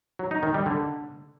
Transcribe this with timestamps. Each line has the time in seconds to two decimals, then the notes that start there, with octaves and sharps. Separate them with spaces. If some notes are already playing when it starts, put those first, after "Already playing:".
0.19 F#3
0.31 D#4
0.43 D#3
0.54 G3
0.66 D3